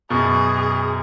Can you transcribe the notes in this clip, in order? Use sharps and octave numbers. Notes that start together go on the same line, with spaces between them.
F#2 B2 G#4